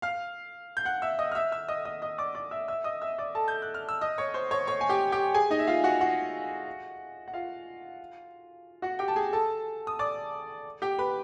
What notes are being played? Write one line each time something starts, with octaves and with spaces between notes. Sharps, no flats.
F5 F6
G6
F#5 F#6
E5 E6
D#5 D#6
F6
E5 E6
E5 E6
D#5 D#6
D#5 D#6
D#5 D#6
D5 D6
D5 D6
E5 E6
E5 E6
D#5 D#6
E5 E6
D5 D6
A4 A5
G6
F#6
F6
E6
D#5 D#6
C#5 C#6
C5 C6
C#5 C#6
C#5 C#6
G#5
G4 G5
G4 G5
G#4 G#5
D#4 D#5
E5
F4 F5
F#4 F#5
F#4 F#5
F#5
F4 F5
F#4 F#5
G4 G5
A5
G#4 G#5
A4 A5
D#6
D5 D6
G4 G5
B4 B5